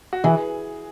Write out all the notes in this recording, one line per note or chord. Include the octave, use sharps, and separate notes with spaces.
F#4
E3 G#4